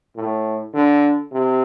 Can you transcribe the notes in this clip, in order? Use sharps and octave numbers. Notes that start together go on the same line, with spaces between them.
A2
D3
C3